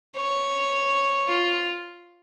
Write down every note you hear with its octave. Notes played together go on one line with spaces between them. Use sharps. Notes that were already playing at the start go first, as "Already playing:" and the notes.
C#5
F4